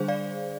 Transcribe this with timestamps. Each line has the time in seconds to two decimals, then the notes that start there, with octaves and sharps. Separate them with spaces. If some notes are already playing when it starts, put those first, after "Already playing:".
Already playing: D3 G3 D4 G#4 C5
0.08 D5 F5